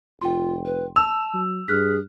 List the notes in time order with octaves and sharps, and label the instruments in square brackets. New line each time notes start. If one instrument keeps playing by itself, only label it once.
[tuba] F1 [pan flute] F4 [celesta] G5 C6
[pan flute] B4
[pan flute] A5 [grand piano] E6 [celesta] F7
[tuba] F#3
[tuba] G2 [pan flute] G#4 [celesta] F6 F#6 B6